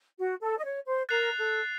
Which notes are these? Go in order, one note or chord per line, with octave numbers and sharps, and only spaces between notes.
F#4
A4
D#5
C#5
C5
A#4 F#6 A6 C7 F7
A4